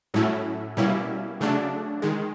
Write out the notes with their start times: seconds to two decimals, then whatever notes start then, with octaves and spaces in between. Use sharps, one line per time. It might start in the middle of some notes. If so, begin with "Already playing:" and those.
0.14 A2 F#3 A3 C#4 E4
0.77 B2 G3 A#3 C#4 E4
1.41 C#3 F#3 A3 D4
2.02 D#3 G#3